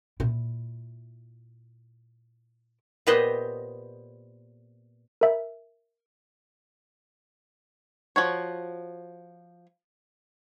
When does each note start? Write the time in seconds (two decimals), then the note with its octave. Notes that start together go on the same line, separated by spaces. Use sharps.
0.20 A#2 E4
3.07 A#2 B3 G4 B4 C5 D#5
5.21 A#4 E5
8.16 F3 F#4 C#5